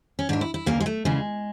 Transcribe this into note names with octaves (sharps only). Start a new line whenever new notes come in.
C#4
G#2 E3 D4
E4
E4
D2 C#3 E3 A#3
G#3
A3
D2 C#3 E3 G#3